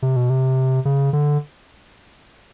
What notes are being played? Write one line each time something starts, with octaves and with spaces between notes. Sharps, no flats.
C3
B2
C3
C#3
D3